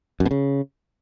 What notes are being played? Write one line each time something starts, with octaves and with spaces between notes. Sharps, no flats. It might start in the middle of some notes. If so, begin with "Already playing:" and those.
F#2
B2
C#3